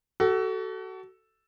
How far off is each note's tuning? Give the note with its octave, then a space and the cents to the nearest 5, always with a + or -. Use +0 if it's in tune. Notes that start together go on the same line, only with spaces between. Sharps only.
F#4 +30 A4 +0